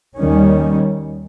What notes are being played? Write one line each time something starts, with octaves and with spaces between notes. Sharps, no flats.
D#2 D#3 G3 C#4